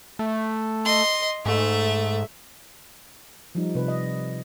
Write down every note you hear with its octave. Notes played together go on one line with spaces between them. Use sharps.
A3
D#5 C6
G#2 A3 E5
F3 G3 D#4
C3 B4
D#5